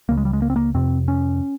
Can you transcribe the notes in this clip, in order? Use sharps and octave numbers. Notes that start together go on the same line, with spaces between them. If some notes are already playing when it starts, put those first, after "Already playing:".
C#2 C#3 A#3
G#3
G3
G#3
A#3
C4
A#3
F2 C3 C4
C#4